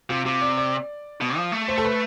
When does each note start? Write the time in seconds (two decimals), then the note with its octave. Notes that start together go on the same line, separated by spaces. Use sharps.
0.09 C3 F4
0.25 C3 F4
0.42 D5
0.58 D5
1.21 B2
1.37 F3
1.52 A3
1.68 C5
1.78 A4
1.85 B4